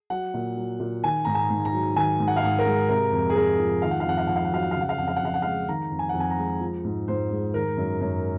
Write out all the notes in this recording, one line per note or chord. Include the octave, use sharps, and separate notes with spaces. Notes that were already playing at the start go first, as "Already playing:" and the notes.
F#3 F#5
A#2
F#3
A#2
D#3 G#5
G#2 A#5
G#5
G#2
A#5
F#3
D#3 G#5
G#2
F#5
F5
G#2 F#5
A#4
G#3
C3 A#4
F2
G#4
G#3 A#4
F3
D#3 F5
F#5
F5
F2 F#5
F5
F2 F#5
F5
F#5
F#3 F5
F#5
C#3 F5
F#5
F5
F2 F#5
F5
F#5
F2 F5
F#5
G#3 F5
D#3 A#5
F2
G#5
F#5
F2
G#5
A#5
G#3
F3
G#2
G#2 C5
G#3
D#3 A#4
F#2
F#2